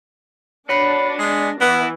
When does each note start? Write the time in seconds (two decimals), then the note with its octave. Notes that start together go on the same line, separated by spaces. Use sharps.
0.69 D4 F#4 B4 C#5 F#5 B5 C7
1.19 G#3 B3 G#4 A#6
1.61 E3 B3 E4